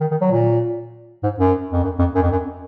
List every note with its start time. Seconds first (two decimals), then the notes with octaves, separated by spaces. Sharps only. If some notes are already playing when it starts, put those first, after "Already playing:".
0.01 D#3
0.11 D#3
0.21 F#3
0.31 A#2
1.23 G#2
1.38 F#2
1.72 F2
1.84 F#2
1.99 F2
2.15 F#2
2.22 F2
2.31 F#2